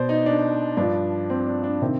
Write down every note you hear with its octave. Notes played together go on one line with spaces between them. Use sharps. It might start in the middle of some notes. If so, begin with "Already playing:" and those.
Already playing: B2 C5 D5
D#4
D4
G2 F3 D4
C4
D4
D4
C3 D#3 C4